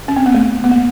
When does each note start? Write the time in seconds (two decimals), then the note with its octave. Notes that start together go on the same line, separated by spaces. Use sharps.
0.08 C#4
0.16 C4
0.26 B3
0.35 A3
0.64 B3
0.71 A#3